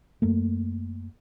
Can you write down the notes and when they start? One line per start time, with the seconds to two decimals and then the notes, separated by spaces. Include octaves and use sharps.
0.22 F#2 A3 A#3